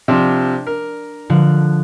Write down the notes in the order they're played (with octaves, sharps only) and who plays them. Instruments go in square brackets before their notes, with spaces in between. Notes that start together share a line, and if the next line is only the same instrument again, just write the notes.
[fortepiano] C3 F3 [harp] D4 D5
[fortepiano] A#4
[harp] D3 F3 F#6